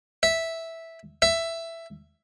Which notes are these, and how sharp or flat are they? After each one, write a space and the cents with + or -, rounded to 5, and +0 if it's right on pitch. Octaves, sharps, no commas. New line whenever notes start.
E5 -5
E5 +10